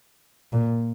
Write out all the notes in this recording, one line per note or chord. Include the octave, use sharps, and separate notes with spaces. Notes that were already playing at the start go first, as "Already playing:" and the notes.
A#2